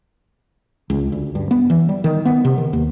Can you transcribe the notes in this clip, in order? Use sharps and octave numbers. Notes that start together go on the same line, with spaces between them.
C#2
D2
G2
B3
E3
G3
D#3
B3
C3
D#3
D#2